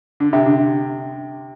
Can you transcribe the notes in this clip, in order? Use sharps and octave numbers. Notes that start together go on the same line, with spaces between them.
D3
C3
D3